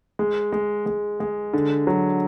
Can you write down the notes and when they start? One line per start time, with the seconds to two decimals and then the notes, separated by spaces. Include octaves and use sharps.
0.19 G#3
0.53 G#3
0.86 G#3
1.20 G#3
1.54 D3
1.87 F#3